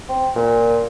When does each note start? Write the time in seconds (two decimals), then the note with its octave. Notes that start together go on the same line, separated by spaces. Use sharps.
0.09 C4
0.36 A#2